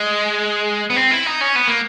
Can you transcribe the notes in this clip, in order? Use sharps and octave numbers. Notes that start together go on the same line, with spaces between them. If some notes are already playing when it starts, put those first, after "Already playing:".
Already playing: G#3
B3
C4
E4
D#4
C#4
B3
A#3